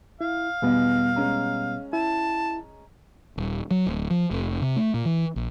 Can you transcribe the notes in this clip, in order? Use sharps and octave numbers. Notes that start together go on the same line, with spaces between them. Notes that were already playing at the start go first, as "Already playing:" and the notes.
E4 F5
B1 E2 B2 G3 B3
G#3 C#4 A#5
E4 A5
D#1
F#3
D1
F3
F1
C3
A3
A#2
E3
A#1